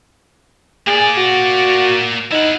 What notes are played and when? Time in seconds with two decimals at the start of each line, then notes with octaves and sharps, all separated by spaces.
0.87 A#3 G#4 D5
1.17 F#4
2.32 D#4 E4 F#5